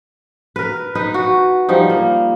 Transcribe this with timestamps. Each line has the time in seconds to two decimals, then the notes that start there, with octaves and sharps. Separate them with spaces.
0.56 A#4 B4
0.95 D#4 B4
1.14 F#4
1.69 F3 G3 D#4
1.90 A#3